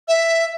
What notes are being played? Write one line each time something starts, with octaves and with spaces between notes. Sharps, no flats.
E5